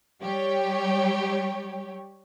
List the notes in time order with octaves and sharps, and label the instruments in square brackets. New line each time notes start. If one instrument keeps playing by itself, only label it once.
[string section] G3 G4 C#5